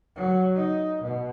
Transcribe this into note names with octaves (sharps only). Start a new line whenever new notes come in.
F#3
D#4
B2